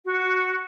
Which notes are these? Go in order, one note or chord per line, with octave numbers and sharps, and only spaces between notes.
F#4